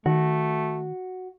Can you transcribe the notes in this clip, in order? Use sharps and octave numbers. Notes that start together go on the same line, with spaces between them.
D#3 A3 F#4